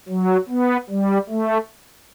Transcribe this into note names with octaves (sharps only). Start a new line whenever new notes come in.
F#3
B3
G3
A3